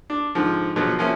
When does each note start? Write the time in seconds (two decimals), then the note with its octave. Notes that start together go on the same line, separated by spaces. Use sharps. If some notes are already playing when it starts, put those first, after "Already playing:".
0.10 D4
0.35 G#2 D3 F3
0.76 B2 D3 F3 F#3 B3
0.99 F3 F#3 A#3 C#4 E4